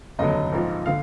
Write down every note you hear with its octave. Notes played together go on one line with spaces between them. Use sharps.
F1 D#2 D3 F#3 D#5
A#1 G#2 F3
D3 F5